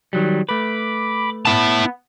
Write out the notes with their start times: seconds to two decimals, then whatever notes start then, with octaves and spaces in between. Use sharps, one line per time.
0.13 D#3 F#3 G3
0.49 A3 B4 B5 D6
1.45 B3 E4 A5